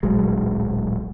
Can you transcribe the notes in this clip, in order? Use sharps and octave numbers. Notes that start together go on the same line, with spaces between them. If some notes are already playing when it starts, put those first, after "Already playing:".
D1 A#1 F#3 G#3